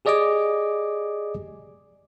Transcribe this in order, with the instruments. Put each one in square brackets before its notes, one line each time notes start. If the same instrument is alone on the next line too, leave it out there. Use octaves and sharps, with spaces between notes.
[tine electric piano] G4 G#4 D5 D#5 G#5 D6